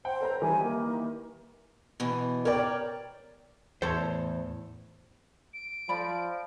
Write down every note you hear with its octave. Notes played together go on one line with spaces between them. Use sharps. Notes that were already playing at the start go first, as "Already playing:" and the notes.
C5 F#5 G5
A4 B4 A#5
D#3 E3 G3 G#5
A#3
B2 E3
A#4 C#5 D5 G5
E2 A2 A4 C5 C#5 E5 A5
D7
F3 A4 D5 B5